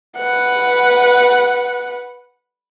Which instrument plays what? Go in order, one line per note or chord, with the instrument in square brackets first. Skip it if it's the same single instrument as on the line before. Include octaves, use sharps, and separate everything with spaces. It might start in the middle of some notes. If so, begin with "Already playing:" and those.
[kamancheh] B4 F#5